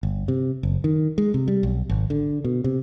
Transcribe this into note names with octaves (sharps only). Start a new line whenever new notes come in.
G1
C3
F#1
D#3
G#3
C3
G3
B1
G#1
D3
B2
C3